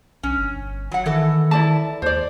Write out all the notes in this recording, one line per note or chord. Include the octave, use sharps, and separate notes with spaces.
B1 C#4
G1
F#3 F#5
D#3 E3 A4
E4 D5 A5
D#2 C5 D5